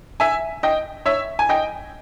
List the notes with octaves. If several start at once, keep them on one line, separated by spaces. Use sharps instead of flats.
E5 G#5
D#5 G5
C#5 E5
G#5
D#5 G5